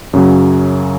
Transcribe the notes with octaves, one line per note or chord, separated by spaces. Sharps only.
F#2 C#3 F#3